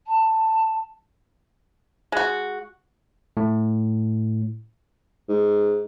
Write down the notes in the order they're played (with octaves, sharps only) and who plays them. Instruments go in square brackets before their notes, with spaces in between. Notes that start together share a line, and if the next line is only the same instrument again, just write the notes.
[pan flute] A5
[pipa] G#3 F#4
[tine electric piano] A2
[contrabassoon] G#2